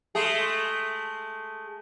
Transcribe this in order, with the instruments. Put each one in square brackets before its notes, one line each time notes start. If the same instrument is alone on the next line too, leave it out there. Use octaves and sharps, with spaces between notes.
[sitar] G#3 A3 G#4